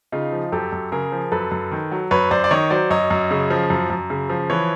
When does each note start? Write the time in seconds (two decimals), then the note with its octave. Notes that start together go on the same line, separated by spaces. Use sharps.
0.12 C#3 D#4 F4
0.32 F3
0.52 F#2 G4 A4
0.72 F#2
0.92 C#3 G#4 A#4
1.12 F3
1.32 F#2 A4 B4
1.52 F#2
1.71 D#3
1.92 F#3
2.11 F#2 B4 C#5
2.31 F#2 C5 D5
2.44 D5
2.51 D#3 C#5 D#5
2.70 F#3 C5 D5
2.90 F#2 C#5 D#5
3.10 F#2
3.31 C#3
3.50 F3
3.70 F#2
3.90 F#2
4.10 C#3
4.29 F3
4.50 E3 B4 C#5